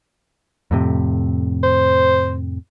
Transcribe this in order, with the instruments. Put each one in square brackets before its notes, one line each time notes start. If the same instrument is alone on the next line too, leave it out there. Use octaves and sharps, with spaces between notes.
[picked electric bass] F2 A2 C3
[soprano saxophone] C5